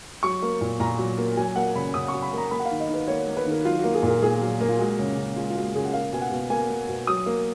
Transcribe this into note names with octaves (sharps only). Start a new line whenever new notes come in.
F#3 C#6
A#3
A#2
A#2 A#5
F#3
A#3
F#3 G#5
A#3 F#5
C#3 B5
C#3 D#6
C#6
F#3
B5
A#3 A#5
A#3 B5
F#5
F5
D#3
D#5
D#3 B4
A#3 C#5
A#3
B4
D#3
A#4
F#3 F4
A#3 F#4
G#4
A#2
A#4
A#2 G#4
F#3
A#3
F4
G#3 F#4
C#3
C#3
G#3 F4
F4
G#3 F#4
C#3 G#4
F#5
A#3 F5
B2 G#5
F#5
B2
A#3 G#5
A#3
B2
F#3 D#6
A#3